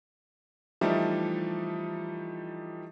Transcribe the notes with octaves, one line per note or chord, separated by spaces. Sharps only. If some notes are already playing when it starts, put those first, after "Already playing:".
E3 F3 G3 A3 D#4 G4